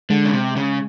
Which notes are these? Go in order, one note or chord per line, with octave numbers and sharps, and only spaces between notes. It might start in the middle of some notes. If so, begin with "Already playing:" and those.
D3 G#3
C#3
C3
C#3